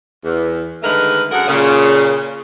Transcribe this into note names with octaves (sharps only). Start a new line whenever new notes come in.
E2
D3 D#3 G#3 A3 A#4 B4
F#2 D3 G#4 A#4 F#5
A#2 C#3